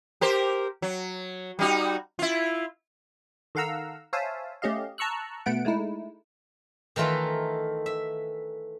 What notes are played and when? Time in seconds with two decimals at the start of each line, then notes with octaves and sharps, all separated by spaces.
0.21 G4 A#4 C5
0.82 F#3
1.59 G3 D#4 F#4
2.19 E4 F4
3.55 D#3 A4 F5 F#5 A#5 E6
4.13 C5 C#5 E5 F5 G#5 A5
4.62 A3 C#4 G4 D#5 F5
4.98 A5 A#5 C#6 E6 F#6
5.46 B2 A3 B3 F#5 D7
5.65 G#3 A3 D#4 E4
6.96 D#3 E3 A3 F4 A#4 B4
7.86 E5